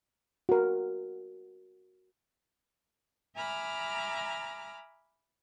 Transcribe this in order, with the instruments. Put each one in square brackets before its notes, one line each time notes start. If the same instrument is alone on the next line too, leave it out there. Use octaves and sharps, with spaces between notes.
[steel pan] F#4 A#4
[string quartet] E5 G#5 A#5 B5 D6 F6